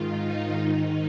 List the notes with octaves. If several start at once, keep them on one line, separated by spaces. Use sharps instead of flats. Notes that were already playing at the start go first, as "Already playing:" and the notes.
Already playing: G#2 D#3 F4
D#4
G#2 D#3 D#4